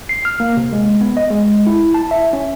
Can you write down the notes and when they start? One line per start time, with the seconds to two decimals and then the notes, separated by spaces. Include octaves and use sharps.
0.09 C7
0.25 F6
0.40 A#3
0.57 C3
0.73 G#3
1.01 B3
1.17 D#5
1.30 G#3
1.67 E4
1.94 A5
2.11 E5
2.33 C#4